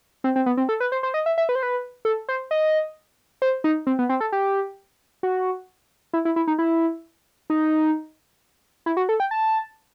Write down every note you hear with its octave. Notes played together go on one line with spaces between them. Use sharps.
C4
C4
B3
C4
A4
B4
C5
C5
D#5
E5
E5
B4
C5
B4
A4
C5
D#5
C5
D#4
C4
B3
C4
A4
G4
F#4
E4
E4
E4
D#4
E4
D#4
E4
F#4
A4
G5
A5